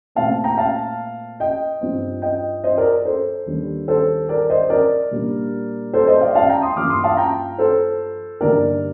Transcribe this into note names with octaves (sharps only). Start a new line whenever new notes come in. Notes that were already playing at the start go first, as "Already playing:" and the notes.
A#2 A3 C4 F5 A5
G5 A#5
F5 A5
D#5 G5
G2 F3 C4 D#4
D#5 G5
C5 D#5
A#4 D5
A4 C5
D#2 D#3 G3 D4
A4 C5
A#4 D5
C5 D#5
A#4 D5
A#2 G3 A#3 D4
A4 C5
C5 D#5
D5 F5
F5 A5
G5 A#5
C6 D#6
G2 F3 A#3 D6 F6
C6 D#6
F5 A5
G5 A#5
A4 C5
G2 D3 G3 A#3 D#4 A#4 D5